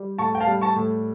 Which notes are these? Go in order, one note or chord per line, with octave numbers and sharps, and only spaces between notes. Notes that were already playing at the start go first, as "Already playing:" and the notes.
Already playing: G3
A2 A5 C#6
G5
F5 A5
G3
A5 C#6
A2